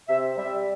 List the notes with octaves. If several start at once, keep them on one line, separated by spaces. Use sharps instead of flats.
C3 E5
G3 E5